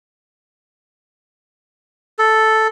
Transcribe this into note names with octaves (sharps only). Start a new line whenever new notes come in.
A4